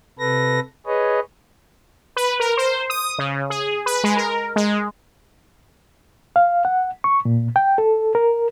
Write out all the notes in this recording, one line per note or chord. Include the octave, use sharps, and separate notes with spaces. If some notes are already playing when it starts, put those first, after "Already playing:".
C3 A4 B4 A#6
G#4 B4 C#5 D#5
B4
A#4
C5
D#6
C#3
G#4
B4
G#3
A#4
G#3
F5
F#5
C#6
A#2
G5
A4
A#4